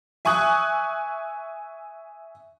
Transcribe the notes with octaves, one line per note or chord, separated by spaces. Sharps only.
E5 G#5 C#6 D#6 F#6